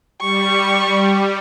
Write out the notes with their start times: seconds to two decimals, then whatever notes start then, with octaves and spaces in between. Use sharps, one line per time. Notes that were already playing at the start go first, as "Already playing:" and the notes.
0.21 G3 C#6